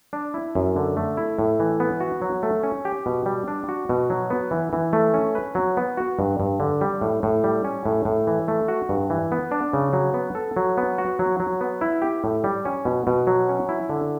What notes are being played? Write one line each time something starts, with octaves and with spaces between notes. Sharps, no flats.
D4
E4
F#2
D3
A3
E4
A2
E3
B3
F#4
F#3
A3
C#4
G4
B2
G3
D4
F#4
B2
F#3
B3
E3
E3
A3
C#4
B4
F#3
B3
F#4
G2
G2
D3
G3
A2
A2
G3
C#4
A2
A2
E3
A3
F#4
G2
E3
B3
D4
C#3
F#3
B3
A4
F#3
B3
F#4
F#3
F#3
B3
E4
G4
A2
G3
C#4
B2
B2
F#3
C#4
E4
D3